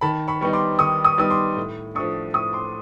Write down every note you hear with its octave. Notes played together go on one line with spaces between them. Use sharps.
D#3 A5 B5
B5 C#6
G3 B3 D#4 C#6
C6 D6
D#3 C#6 D#6
C#6 D#6
G3 B3 D#4 D#6
C6 D6
A2
F3 A3 D4 C#6 D#6
A2 C#6 D#6
C6 D6